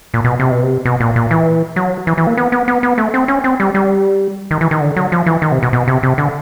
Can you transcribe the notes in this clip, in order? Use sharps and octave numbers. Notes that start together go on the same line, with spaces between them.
A#2
B2
C3
B2
C3
B2
A#2
A#2
E3
F#3
E3
E3
A#3
B3
B3
B3
B3
A3
C4
C#4
C4
G3
G3
D#3
E3
D#3
D3
F#3
F3
E3
D#3
C3
B2
B2
C3
C3
D3